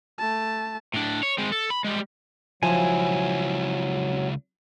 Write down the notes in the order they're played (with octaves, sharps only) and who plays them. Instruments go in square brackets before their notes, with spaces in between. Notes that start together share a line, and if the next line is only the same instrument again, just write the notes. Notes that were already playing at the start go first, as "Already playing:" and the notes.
[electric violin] A3 A5
[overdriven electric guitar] A2 D4
C#5
G#3 C4
A4
B5
G3 G#3
[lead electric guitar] C#2 E4 [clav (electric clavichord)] F3 F5 [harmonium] F#3 [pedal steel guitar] G#5